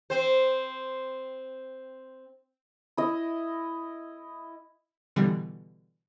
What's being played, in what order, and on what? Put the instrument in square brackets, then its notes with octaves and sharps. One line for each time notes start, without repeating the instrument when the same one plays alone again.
[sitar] C4 C5
[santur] E4 D#5
[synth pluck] B2 D3 E3 G3